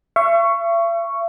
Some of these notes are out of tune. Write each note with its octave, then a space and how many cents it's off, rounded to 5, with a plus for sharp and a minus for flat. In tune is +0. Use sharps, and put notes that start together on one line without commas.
E5 +40 C#6 +0